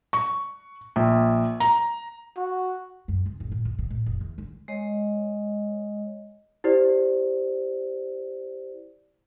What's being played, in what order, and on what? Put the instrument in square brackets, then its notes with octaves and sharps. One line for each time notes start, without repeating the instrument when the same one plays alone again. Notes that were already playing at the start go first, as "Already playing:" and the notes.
[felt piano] C#6
A#1
A#5
[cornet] F#4
[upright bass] F#2
C#2
G1
A2
F2
C3
A2
F1
E2
D3
[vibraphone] G#3 C#5 D#5
[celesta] E4 G4 C5 D5